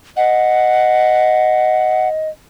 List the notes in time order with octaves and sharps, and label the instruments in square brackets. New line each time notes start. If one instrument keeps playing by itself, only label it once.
[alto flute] D#5 [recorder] F#5